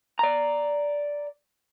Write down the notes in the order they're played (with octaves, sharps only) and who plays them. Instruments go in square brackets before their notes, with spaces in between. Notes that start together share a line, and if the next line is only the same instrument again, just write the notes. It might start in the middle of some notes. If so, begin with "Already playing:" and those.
[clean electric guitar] D5 A#5